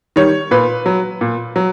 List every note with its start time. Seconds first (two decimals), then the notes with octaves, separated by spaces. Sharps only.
0.16 D#3 G3 C#5
0.51 A#2 B4
0.86 F#3
1.21 A#2
1.56 F#3